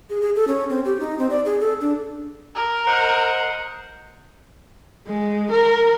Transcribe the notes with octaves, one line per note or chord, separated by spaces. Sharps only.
G#4
G#4
A4
C#4
C4
G4
D#4
C4
D5
G#4
A4
D4
A#4
C5 D#5 F#5
G#3
A#4